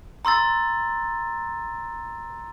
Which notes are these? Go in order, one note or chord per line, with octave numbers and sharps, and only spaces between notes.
A#5 C6 E6 A6